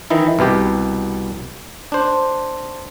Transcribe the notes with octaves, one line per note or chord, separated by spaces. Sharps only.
D#3 E3 D#4 E4
C2 B2 B3 G4
D4 C5